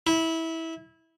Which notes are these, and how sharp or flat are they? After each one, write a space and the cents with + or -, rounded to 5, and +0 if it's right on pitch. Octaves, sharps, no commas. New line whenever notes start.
E4 -20